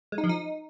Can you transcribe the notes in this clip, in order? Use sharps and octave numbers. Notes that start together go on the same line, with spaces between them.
G#3
D#4
F3
D#4